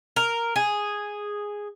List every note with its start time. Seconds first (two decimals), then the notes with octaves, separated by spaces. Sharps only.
0.16 A#4
0.56 G#4